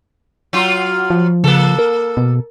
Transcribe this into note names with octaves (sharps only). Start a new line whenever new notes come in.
F#3 F4
F3
C#3 A#3 A4
A#4
B2